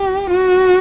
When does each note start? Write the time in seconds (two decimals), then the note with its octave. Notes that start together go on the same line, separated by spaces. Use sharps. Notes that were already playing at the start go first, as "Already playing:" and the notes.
Already playing: G4
0.30 F#4